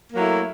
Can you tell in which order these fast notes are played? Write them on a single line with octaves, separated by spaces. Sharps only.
A#3 F#3 E4 A3